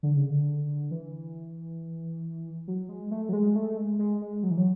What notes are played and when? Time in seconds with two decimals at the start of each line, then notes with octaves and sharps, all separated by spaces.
0.03 D3
0.16 C#3
0.30 D3
0.91 E3
2.68 F#3
2.89 G#3
3.11 A3
3.29 F#3
3.33 G#3
3.56 A3
3.77 G#3
3.99 G#3
4.21 G#3
4.43 F#3
4.50 E3
4.57 F#3